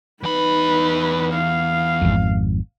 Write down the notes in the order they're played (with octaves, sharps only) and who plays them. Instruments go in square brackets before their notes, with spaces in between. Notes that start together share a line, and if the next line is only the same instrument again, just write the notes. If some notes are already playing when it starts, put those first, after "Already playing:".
[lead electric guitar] E2 B5 [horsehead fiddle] D#4 B4
[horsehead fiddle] F5
[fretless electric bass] G#1 F2